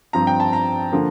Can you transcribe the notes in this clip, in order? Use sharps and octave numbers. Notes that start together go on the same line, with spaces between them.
G2 F3 C4 A#5
G5
A5
A#5
D3 F3 A#3